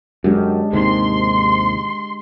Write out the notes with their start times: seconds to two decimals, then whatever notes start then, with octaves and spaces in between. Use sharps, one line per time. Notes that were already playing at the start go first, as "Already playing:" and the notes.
0.24 F#2 G#3 D4 G4
0.73 D#2 G#2 C3 C6